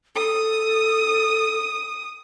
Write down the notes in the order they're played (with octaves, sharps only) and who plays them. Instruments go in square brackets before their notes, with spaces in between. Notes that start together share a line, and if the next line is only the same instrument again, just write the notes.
[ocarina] A4 [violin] D#6